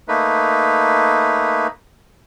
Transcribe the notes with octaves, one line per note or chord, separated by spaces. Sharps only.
A3 A#3 D#4 B4